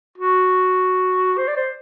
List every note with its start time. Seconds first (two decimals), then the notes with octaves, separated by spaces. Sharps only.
0.18 F#4
1.38 C5
1.47 D5
1.57 C5